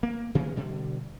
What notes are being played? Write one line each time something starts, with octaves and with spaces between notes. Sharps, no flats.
A#3
C3 E3 A#3 B3
B2 D3 G3